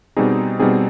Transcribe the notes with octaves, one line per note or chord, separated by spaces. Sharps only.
B2 G3 C4 D#4 G#4
B2 G3 C4 D#4 G#4